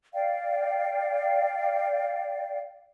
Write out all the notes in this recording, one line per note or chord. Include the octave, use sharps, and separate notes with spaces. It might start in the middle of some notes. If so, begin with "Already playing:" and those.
D5 F5 G5